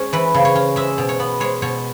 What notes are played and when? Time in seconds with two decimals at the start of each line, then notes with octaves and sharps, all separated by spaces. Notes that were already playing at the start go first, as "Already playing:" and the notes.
Already playing: G#3 C#4
0.13 E3 B4
0.34 C#3
0.45 C#5
0.55 C#4
0.76 G#3 E5
0.98 B2
1.09 C#5
1.20 B3
1.40 G#3 C#5
1.62 B2 C#5